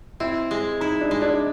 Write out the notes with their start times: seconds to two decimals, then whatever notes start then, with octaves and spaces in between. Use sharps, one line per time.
0.20 C4 E4
0.51 G#3
0.81 D#4 E4
1.01 D4
1.11 G#3
1.22 D4